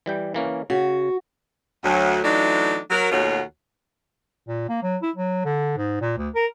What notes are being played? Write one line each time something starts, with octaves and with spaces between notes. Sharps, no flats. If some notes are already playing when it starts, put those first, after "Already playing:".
E3 G3 G5
E3 A#3 C#4
C#3 F#4
D2 F#3
E3 F#3 A3 D4 D#4
F#3 A#4
D#2 B2 A3 F4 F#4 C#5
A#2
A#3
F#3
E4
F#3
D3
G#2
A#2
D2
A#4